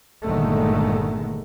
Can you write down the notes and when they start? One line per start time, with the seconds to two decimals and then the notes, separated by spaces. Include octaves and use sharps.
0.25 G1 A#2 D3 D#3 G#3 A3